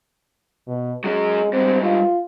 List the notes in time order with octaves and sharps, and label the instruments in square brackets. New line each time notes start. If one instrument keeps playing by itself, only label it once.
[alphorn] B2
[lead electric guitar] F#3 C#4 [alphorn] G#3
[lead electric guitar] G#2 G3 [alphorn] C4
[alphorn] F4